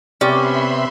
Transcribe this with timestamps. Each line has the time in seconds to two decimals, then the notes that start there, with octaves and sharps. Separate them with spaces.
0.21 C3 B3 C#4 G4 D5 E5 B5 C6